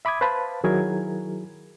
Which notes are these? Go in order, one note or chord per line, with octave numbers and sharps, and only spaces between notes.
E5 B5 D6 D#6 G#6
B4 C5 F5 A5 B5
D#3 F#3 E4 G#4 A#4 G#6